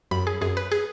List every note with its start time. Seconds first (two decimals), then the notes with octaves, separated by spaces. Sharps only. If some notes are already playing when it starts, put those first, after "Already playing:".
0.11 F#2 B5
0.27 G#4
0.41 F#2 G#4
0.57 B4
0.72 G#4